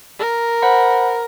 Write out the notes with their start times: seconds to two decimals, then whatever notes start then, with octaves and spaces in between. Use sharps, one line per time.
0.19 A#4
0.62 C5 F#5 B5